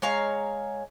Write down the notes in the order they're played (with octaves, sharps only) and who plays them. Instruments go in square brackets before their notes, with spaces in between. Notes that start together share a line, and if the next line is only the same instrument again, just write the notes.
[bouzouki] G#3 C#5 F5 A#5